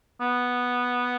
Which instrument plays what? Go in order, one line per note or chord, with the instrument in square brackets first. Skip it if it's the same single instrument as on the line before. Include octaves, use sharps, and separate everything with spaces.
[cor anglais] B3